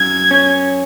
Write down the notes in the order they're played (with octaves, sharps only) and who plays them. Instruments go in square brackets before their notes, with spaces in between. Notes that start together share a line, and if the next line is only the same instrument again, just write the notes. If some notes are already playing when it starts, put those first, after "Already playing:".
Already playing: [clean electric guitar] F#2 [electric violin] G#6
[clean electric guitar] C#4